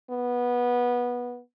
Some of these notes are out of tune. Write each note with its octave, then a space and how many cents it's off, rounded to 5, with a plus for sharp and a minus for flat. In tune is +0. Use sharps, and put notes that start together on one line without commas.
B3 -15